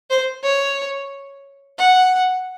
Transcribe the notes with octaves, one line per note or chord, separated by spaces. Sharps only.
C5
C#5
F#5